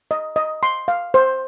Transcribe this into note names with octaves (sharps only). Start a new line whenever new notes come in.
D#5
D#5
C6
F5
C5